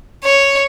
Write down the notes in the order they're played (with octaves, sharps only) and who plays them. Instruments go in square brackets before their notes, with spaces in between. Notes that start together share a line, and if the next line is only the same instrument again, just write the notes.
[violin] C#5